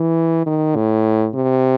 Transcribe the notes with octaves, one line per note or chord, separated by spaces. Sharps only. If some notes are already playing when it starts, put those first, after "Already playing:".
Already playing: E3
D#3
A2
C3